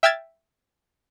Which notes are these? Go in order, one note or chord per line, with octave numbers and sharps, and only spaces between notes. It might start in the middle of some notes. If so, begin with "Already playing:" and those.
E5 G5 E6 F6 G#6 A6